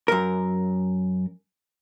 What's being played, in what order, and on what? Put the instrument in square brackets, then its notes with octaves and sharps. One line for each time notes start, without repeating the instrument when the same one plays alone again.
[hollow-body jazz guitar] F#2 A#4